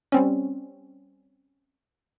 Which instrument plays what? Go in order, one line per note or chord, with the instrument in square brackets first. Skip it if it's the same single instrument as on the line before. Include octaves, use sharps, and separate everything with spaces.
[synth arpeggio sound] G3 C4 C#4